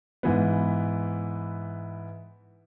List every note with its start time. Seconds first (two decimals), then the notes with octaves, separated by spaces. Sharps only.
0.23 G#2 E3 B3